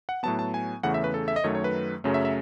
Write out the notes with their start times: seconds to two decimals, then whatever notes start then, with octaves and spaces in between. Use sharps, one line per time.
0.09 F#5
0.23 A2 F#3 B3 A5
0.39 A5
0.54 G#5
0.83 E2 C#3 E3 A3 C#4 F#5
0.94 E5
1.04 B4
1.14 A4
1.28 E5
1.36 D#5
1.44 F#2 D#3 F#3 A3 C#5
1.55 C#5
1.64 B4
2.04 F#2 C#3 F#3 A3 C#4
2.14 E5
2.25 E5